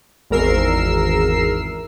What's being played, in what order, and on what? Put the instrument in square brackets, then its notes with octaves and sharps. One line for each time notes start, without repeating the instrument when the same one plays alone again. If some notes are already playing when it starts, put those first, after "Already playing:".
[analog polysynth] G#1 E2 A#4 E6 C7